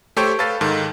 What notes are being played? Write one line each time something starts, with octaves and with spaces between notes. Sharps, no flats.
A3 G4 A4 C5 C#5 G5
A4 B4 F5 A6
G#2 D#3 A4